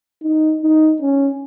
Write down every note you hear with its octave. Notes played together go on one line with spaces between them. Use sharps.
D#4
D#4
C#4